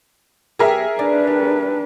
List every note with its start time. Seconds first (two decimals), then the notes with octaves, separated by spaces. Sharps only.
0.59 F#2 B3 G4 G#4 A#4 E5
0.99 D4 B4 D5
1.27 G3